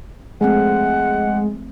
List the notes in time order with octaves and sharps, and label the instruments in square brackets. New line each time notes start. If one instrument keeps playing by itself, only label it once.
[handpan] F3 A3 C4 [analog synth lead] G#3 [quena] F#5